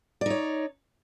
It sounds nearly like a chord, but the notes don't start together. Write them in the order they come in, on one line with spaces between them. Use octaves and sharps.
D5 D#4 C#5